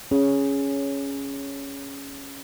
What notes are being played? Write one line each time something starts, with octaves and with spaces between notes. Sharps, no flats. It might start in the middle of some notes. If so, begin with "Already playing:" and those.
C#4 G#4